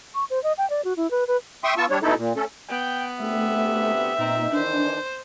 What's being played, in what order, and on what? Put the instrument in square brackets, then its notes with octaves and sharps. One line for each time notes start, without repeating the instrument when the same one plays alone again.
[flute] C#6
C5
D#5
G5
D5
F#4
E4
B4
B4
[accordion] E5 G5 C6 C#6 D#6
B3 F4 A5 C#6 E6
G3 D4 C#5
B2 A3 D#4 E4 A4
A#2
A3 C#4 A4
[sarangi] B3 [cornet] G5
[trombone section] D2 C3 G4 [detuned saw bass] A3 [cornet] E5
[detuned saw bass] A#2 [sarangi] C4 [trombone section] D#4
[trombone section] D#3 E3 [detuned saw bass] D4 [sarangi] C5